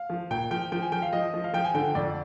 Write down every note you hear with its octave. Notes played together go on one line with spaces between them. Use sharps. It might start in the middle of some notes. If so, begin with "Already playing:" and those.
Already playing: F5
F3
A#2 G5
F3 G5
F3 G5
G#5
F3 G5
F5
F3 D#5
F3
F5
F3 G5
G#5
D3 G5
G5
F2 D5